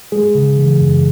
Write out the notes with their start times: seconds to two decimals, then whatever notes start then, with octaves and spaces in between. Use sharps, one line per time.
0.12 G#3 G#4
0.35 C#3
0.57 E3
0.81 F#2